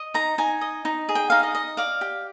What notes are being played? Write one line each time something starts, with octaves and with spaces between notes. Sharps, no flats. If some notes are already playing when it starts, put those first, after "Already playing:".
Already playing: D#5
D#4 A#5
D#4 G#5
D#5
D#4
G#4
G5
D#4 F5
D#5
D#5
D5 F5
G4